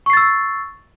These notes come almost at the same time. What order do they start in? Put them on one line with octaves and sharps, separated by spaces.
C#6 C7 A6 E6